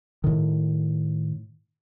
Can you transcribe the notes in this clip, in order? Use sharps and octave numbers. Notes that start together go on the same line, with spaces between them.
A2 D#3